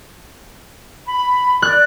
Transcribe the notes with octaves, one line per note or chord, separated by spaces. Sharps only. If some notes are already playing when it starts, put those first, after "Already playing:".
B5
D5 F#6